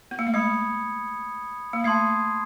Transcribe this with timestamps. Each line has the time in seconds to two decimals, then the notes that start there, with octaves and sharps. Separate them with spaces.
0.11 B3
0.19 A#3
0.27 A3
0.34 G#3 B5 D#6 G#6 C#7
1.73 A#3
1.84 A3 A5 C6 D#6 G#6 C7